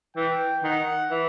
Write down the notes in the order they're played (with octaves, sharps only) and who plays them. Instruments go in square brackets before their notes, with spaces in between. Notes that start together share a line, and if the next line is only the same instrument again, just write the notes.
[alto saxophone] E3 [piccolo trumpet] G5
[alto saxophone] D#3 [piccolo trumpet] F#5
[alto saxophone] E3